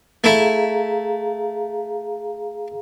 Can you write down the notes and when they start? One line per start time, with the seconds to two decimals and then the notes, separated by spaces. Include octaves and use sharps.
0.24 A3 E4 G#4 F5 A#5